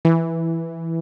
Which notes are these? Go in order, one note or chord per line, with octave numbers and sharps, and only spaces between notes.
E3